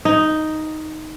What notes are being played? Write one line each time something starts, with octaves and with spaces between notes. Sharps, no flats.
D#4